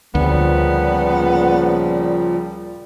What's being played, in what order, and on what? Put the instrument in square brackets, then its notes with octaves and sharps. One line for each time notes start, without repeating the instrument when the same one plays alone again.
[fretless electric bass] D2 [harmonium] A#2 C#3 F3 [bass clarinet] G3 [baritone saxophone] B3